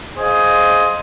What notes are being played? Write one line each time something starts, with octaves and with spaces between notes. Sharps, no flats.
G#4 C5 D#5 F5